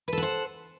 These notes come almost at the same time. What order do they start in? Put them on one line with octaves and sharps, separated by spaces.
B4 A4 F#5 C5